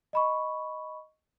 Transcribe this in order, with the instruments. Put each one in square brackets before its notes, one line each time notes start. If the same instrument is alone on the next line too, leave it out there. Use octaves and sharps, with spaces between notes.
[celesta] D#5 B5 C#6